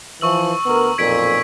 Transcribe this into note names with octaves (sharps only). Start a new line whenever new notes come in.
E3 F3 C#6 E6 F#7
D2 B3 A#4
B1 F2 A#2 G#6 B6 D7